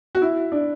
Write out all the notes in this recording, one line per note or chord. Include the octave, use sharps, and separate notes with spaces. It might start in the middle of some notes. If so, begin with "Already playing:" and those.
F#4
E4
D4